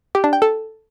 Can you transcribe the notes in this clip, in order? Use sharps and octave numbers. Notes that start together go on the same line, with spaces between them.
G4
D4
G5
A4